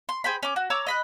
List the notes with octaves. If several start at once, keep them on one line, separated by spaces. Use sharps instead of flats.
C6
G#4 C5 G5 B5
C#4 D6
F#4
C#5 A#5 D6 E6
D#5 B5 F#6